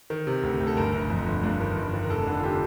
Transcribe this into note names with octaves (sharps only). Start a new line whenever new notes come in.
D#3
C3
D2
D2
A4
G1 A#4
G1
F2
G1
G2
D#3
G1
D#3
A#4
F1 A4
D3
F4
D3 G4